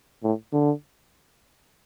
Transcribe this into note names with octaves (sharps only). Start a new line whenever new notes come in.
A2
D3